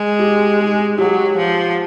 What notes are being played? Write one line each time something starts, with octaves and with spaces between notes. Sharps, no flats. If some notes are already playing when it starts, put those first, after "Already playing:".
Already playing: G#3
G4
G#4
F#3 G4
F3